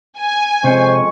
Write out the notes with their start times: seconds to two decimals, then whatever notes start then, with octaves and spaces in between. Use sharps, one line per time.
0.17 G#5
0.64 F2 C3 G#3 C#4 C5 C#6